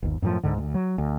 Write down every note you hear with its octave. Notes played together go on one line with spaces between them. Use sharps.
G1 D#2
F#2 A2 C3 F3
C#2 G#2 D3
D2
F#3
D2